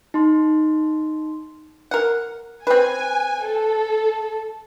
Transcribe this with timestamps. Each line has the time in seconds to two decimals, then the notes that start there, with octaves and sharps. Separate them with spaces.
0.14 D#4 C6
1.91 A#4 F#5
2.67 C4 B4 G#5
3.45 A4